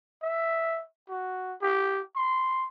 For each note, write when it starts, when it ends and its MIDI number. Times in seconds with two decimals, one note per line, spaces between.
0.22 0.83 76
1.09 1.55 66
1.61 2.01 67
2.16 2.68 84